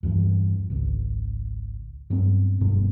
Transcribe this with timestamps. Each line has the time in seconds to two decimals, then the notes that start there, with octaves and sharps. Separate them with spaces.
0.03 E2 G2 E3
0.70 G#1 C#2
2.10 G2 F#3 B3 C4
2.61 F#1 G2 B2